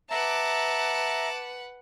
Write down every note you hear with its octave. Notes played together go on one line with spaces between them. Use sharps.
B4 E5 F#5 A5 A#5 D6